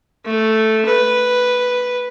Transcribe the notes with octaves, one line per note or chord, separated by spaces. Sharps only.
A3
B4